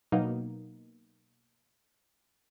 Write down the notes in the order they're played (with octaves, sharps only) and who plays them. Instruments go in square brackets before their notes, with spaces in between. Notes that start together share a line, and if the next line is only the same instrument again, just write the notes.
[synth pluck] B2 F#3 A#3 B3 D#4